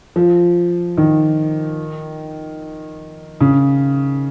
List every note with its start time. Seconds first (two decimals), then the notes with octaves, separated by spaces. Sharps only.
0.16 F3
0.97 D#3
3.41 C#3